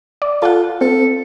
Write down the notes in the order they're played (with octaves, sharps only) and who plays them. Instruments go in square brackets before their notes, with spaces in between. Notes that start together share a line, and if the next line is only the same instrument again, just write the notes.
[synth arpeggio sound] D5
[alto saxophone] F4 [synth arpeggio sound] A4 F#5
[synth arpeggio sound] C4 [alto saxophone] A4